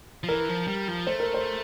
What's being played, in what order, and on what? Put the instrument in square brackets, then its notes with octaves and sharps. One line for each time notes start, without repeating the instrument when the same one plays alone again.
[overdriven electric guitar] F3
[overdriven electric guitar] E3 [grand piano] A#4
[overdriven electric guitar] F3
G3
F3
[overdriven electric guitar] A3 [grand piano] C5
[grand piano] A#4
C5